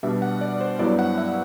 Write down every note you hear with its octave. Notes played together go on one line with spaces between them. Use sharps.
B2 G3 B3 D4 E5
F#5
D5
C5
G2 F#3 B3 E4 D5
F#5
E5